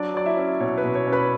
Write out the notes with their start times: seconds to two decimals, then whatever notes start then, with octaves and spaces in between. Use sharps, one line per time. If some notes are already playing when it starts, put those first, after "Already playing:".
Already playing: F#3 D4 D5
0.14 F#3 D5
0.26 E4 E5
0.37 C#4
0.60 B2 C#5
0.78 B4
0.84 B2
0.95 C#5
1.07 C#4
1.12 B4 B5